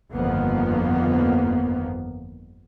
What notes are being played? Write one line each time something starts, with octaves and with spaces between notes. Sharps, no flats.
G1 F2 D#3 F3 A#3 B3